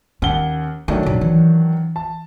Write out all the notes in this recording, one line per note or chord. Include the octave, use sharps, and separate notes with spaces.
D#2 C#4 F#5 G7
D#3 F#3 A3 D4
E1 B2
E3
A5